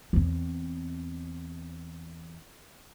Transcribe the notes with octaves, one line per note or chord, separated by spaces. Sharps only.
E2 C4